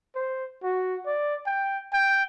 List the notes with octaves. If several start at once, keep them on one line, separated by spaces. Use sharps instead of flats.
C5
F#4
D5
G5
G5